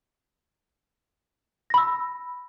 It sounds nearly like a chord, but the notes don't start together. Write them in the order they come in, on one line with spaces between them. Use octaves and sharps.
A#6 B5 E6